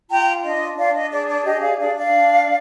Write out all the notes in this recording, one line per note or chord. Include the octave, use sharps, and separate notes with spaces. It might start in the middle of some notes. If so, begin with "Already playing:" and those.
F4 G5 A#5
D4 D#5
D4 D5 F5
D#5
G#4 D5
D5
G4 D#5
D5 F5
D4 D5 F5
D5 F5
D4